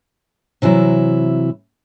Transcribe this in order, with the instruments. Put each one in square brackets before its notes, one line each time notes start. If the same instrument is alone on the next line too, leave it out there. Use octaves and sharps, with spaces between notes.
[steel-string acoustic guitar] C3 E3 F#3 E4